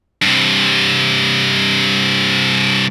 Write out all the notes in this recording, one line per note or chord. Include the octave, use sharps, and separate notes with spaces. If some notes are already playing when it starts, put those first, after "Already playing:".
G2 C3